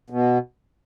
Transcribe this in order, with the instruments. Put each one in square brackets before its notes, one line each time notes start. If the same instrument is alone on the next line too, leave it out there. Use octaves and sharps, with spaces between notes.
[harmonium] B2